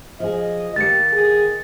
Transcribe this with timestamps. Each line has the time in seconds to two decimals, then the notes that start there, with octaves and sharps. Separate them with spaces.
0.20 F3 G#4 D#5
0.76 D#3 A#3 G4 A6 C#7
1.13 G#4